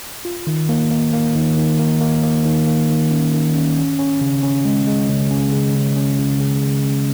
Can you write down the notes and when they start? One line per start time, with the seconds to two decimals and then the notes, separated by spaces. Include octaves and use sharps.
0.25 F4
0.47 D#3
0.69 A#3
0.91 A#3
1.13 A#3
1.35 D#3
1.57 D#3
1.79 A#3
2.01 A#3
2.23 A#3
2.45 D#3
2.67 A#3
2.89 D#3
3.11 C#4
3.33 D#3
3.54 C#4
3.77 C#4
3.99 C#4
4.21 C#3
4.43 C#4
4.65 G#3
4.87 G#3
5.09 C#3
5.31 C#4
5.53 C#3
5.75 C#3
5.96 C#4
6.19 C#3
6.41 C#3
6.63 C#3
6.85 C#4